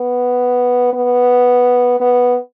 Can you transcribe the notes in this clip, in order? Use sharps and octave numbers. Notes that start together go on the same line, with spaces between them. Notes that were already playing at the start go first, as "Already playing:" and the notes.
Already playing: B3
B3
B3